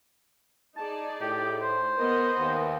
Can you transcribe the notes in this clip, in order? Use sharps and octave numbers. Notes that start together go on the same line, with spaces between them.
D#4 G#4 D5 A5
A2 G4
C5
B3 A#4 B4 D#5
D#2